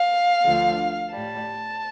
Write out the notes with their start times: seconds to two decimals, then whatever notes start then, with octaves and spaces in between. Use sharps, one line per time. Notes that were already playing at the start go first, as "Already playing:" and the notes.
Already playing: F5
0.45 D2 D3 F3
1.12 A2 G3 A5